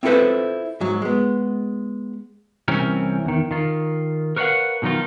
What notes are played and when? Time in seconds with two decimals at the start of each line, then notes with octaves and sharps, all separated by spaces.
0.03 C4 E4 F4 A4 B4 C5
0.80 G#2 F#3
1.02 G#3 B3
2.68 C2 E3 C4 C#4 G4 A#4
3.25 E2 D#3
3.51 D#3 F4
4.36 A#4 B4 C#5 D#5 F5 F#5
4.82 B2 D#3 F#3 D#4 F4